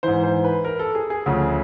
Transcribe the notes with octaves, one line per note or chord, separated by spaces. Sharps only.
G#2 E3 C5
C5
B4
A#4
A4
G#4
G#4
D2 C#3 F3